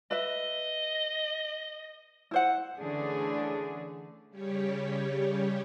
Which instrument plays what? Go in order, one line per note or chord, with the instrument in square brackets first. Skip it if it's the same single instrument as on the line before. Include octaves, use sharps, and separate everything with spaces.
[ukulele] B4 E5 [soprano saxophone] D#5
[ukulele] E4 C5 F#5
[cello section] D3 E3 A3 C#4 D4 G#4
[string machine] C#3 G3 G4 C#5